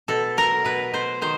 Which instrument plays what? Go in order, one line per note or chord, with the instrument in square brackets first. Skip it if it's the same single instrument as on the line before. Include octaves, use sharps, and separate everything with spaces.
[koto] B2 A4
F#3 A#4
B2 B4
B2 C5
D#3 C5